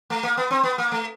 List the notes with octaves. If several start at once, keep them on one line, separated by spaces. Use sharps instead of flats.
A3
A#3
B3
C4
B3
A#3
A3